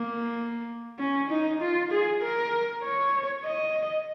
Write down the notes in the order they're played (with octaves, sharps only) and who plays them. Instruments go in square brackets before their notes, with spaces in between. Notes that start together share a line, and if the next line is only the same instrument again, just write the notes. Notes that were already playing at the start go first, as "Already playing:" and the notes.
Already playing: [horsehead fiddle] A#3
C#4
D#4
F4
G#4
A#4
C#5
D#5